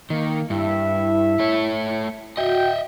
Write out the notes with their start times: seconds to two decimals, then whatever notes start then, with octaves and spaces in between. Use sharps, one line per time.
0.10 D#3 A#3
0.50 G2 E4 E5
1.39 A3 C#5
2.37 F#4 D#5 E5 G5